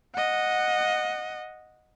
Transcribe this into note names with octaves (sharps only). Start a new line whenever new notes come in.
D#5 F#5